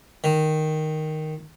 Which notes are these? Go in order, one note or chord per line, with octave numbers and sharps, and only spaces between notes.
D#3